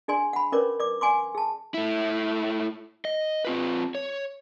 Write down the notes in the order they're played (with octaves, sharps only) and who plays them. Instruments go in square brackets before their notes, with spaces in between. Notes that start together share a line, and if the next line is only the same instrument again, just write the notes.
[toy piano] D4 G#4 D5 G#5 C6
F#5 B5
C#4 A#4 B4 C#5 D5 D6
D5 D6
D5 F#5 G#5 C6 D6
G#4 A5
[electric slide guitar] A3 E4
D#5
C4 F4 B4
C#5